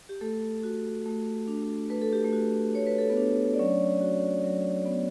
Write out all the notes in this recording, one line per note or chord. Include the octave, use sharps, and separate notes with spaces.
G4
A3 A4
F#4
A3
D4
A3 B4
A4
G4
A3 A4
F#4
A3 C#5
B4
A4
B3 B4
D4
D5
F#3 C#4 C#5
F#4
F#3
B3